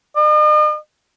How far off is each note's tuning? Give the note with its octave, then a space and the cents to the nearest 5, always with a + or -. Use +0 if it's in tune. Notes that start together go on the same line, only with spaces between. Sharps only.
D#5 -45